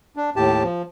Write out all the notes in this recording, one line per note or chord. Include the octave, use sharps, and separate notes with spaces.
D4
D#2 A2 G4 A5
F3